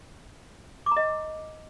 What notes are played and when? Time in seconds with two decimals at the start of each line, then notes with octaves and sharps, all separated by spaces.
0.86 D6
0.91 A#5
0.97 D#5